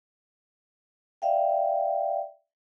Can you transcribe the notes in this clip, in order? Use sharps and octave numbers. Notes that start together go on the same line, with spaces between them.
D5 E5 F5 G5